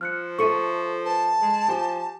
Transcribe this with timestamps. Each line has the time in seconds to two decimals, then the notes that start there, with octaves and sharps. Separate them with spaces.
0.01 F3 F6 F#6 C#7
0.39 A4 E5 C#6 C#7 D#7
1.05 B4 A5
1.41 G#3
1.68 F3 G4 G#5